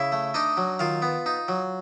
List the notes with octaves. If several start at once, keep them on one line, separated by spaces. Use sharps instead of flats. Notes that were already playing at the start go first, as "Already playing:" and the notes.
Already playing: C#3 E4 E5
A3
D4 D#4 D#5
F#3
D#3 F4 F5
B3
D#4
F#3